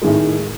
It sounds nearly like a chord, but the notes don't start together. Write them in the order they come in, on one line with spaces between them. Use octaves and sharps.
G#3 D#3 A2